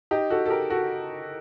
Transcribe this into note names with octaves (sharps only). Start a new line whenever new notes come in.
D#4 G4
F#4 A4
A4
G4 A#4
F#4 A4